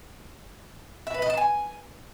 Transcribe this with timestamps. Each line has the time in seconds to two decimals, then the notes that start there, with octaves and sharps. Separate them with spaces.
1.07 E5
1.14 B4
1.22 D#5
1.30 A5
1.37 G#5